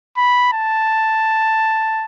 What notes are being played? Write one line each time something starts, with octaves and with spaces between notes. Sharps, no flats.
B5
A5